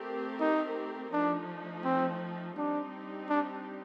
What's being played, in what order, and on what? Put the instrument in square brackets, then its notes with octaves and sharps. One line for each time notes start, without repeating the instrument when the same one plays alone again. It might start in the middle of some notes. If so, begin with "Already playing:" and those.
Already playing: [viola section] A3 C4 G4 A#4
[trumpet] D#4
[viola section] F3 A3 D#4 [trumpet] D4
[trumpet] C4
[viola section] G3 C4 D#4 G4 [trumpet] D4
[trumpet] D4